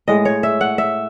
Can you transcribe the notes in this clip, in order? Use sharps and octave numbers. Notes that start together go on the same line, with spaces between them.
A2 G#3 D#5
C#5
E5
F#5
E5